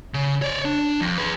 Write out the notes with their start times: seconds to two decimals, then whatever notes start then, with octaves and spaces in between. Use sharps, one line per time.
0.14 C#3
0.42 C#5 D5
0.65 D4
1.01 F2
1.18 G#4 B4